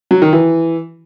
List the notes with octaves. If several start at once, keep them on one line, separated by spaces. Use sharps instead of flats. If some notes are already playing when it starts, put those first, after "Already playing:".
F#3
D#3
E3